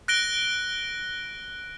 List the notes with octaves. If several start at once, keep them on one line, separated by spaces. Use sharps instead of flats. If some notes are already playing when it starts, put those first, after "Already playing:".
F#6 A#6 D7 G7